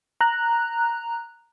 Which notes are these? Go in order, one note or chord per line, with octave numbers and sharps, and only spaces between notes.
A#5 F#6